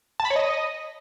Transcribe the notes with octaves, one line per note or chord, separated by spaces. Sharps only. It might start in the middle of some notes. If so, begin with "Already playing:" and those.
A5
B5
C#5
D#5